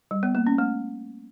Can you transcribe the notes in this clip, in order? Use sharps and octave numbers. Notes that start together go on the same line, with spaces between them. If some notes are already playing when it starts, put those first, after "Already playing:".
G3
B3
A#3
C#4
A3